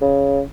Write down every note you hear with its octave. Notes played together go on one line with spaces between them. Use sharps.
C#3